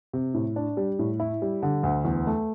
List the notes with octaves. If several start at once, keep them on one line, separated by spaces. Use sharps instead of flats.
C3
A2
D4
G3
A2
E4
G3
D3
D2
E2
A3